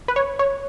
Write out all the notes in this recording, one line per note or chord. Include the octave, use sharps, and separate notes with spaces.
B4
C#5
C#5